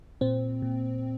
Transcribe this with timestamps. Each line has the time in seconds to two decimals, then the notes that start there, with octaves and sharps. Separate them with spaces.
0.21 A#2 C4
0.62 A#2